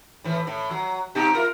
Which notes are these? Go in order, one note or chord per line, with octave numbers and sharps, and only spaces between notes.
A2 E3
A2
F#3
B2 D#4 G4
E4 F4 A#4